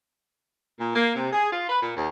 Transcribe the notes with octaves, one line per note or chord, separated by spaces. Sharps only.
A#2
A#3
C3
G#4
F4
B4
A#2
D#2